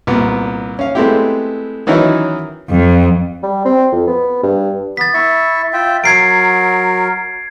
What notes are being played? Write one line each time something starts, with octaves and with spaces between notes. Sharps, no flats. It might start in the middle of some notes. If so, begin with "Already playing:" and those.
C2 A#2 B3
C#4 F5
G#3 A3 B3 C4 E4 G4
D#3 E3 F#3 C#4 D#4 E4
F2
G3
C4
F2
B3
G2
B3 A6 B6
E4 E5 C#6
F4 E5 G5
F#3 A#4 G#6 C7 D7